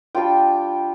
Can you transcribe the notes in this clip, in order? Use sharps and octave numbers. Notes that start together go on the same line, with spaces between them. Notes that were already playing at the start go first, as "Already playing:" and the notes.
G3 D4 F4 G5